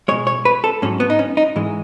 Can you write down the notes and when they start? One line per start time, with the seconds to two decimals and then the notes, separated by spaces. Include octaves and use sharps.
0.08 B2 G#3 C#5
0.27 C#5
0.45 B4
0.64 A4
0.82 G#2 F#3 C#4
1.00 B3
1.10 D#4
1.19 C#4
1.37 D#4
1.56 G#2 E3 G#3